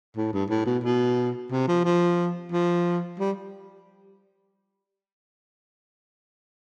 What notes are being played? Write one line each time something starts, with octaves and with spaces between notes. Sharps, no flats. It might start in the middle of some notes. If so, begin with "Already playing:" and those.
A2
G2
A2
B2
B2
C3
F3
F3
F3
G3